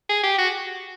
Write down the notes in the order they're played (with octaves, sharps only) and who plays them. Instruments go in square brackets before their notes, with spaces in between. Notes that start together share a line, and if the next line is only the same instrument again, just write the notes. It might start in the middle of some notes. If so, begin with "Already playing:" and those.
[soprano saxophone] G#4
G4
F#4